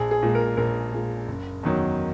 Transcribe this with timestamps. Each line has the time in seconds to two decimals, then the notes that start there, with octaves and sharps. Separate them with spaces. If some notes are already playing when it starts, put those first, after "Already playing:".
Already playing: A#1 G#4
0.11 G#4
0.23 A#2 G#3
0.35 A#4
0.57 A#1 A#4
0.92 A#2 G#3
1.28 F#1
1.63 E2 D#3 F#3